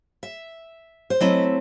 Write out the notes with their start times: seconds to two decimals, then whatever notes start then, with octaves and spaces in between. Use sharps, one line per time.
0.23 E5
1.10 C5
1.20 F#3 A3 C4 E4 D#5